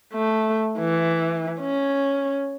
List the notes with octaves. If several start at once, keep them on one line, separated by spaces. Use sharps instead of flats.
A3
E3
C#4